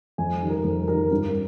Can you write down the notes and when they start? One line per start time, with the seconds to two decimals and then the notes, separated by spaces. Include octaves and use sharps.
0.18 F2 G#5
0.42 D#3 G3
0.50 A#4
0.64 F2 A#4
0.88 D#3 G3 A#4
1.11 G2 A#4